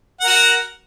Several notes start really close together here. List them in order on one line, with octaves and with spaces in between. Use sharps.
F#5 A#4 F#4